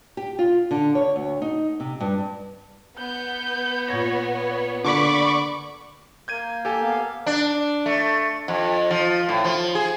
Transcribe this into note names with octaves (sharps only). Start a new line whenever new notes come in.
G4
F4
D3
C#5
D2
D#4
C3
G2
B3 G6
A#2 C#5 G#6 A#6
C#5
D3 A#3 D5 B5 C#6 D6
A#3 G6 G#6 D#7
G4 A4 G#5
A#3 B3 F5
D4
A3
F2
F3
A2
F3
G#4